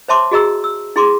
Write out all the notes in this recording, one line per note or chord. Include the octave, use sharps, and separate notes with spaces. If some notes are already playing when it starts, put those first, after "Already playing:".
C5 C#5 E5 A5 C6 D6
F#4 G#4 D#5 A#5 E6
E6
E4 G#4 C6 D6